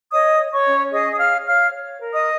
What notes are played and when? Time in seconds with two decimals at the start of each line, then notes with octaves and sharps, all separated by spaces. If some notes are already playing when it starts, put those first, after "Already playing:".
0.11 C#5 D#5 D#6
0.39 C#5
0.52 C#5 C#6
0.65 C#4
0.92 G#4 D#5 D#6
1.13 D#6
1.19 C#5 F5 F6
1.46 C#5 F5 F6
1.74 C#5
2.00 A#4
2.13 D#5 D#6